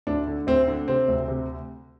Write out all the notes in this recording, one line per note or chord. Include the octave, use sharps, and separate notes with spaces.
D2 D4
D3
D2 C4
D3
C3 C4
D2
C3